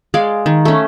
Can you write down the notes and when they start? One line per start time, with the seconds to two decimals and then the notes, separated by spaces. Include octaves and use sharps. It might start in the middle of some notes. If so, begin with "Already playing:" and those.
0.14 G#3 D5 F5
0.46 D#3
0.65 A3 C#4